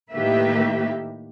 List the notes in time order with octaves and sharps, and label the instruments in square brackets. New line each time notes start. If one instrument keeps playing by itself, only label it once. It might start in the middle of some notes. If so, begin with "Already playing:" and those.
[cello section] A2 D#3 A#3 G4 B4 E5